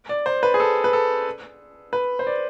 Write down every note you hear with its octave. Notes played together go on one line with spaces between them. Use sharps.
D5
C5
B4
G#4
A4
B4
A4
B4
C5
D5